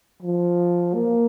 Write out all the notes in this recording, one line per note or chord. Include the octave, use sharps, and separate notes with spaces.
F3
A#3